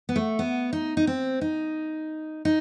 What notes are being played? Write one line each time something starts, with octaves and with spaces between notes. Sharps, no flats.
B3
A3
B3
D#4
D#4
C4
D#4
D#4